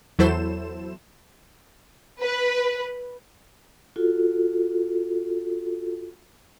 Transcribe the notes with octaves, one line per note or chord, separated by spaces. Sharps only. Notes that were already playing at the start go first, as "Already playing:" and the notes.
E2 F#3 E4 A4 C5 E7
B4
F4 F#4 A4